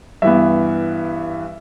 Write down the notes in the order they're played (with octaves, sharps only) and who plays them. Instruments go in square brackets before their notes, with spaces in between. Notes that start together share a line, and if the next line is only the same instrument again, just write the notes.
[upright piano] G2 E3 B3 E5